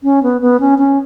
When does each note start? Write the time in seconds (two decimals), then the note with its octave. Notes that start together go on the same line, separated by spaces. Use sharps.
0.03 C#4
0.23 B3
0.41 B3
0.60 C#4
0.79 C#4